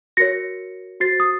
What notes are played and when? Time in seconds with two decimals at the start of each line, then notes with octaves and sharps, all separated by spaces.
0.17 F#4 A#4 C#5 A#6 C#7
1.00 F#4 C5 A6 C7
1.20 D#6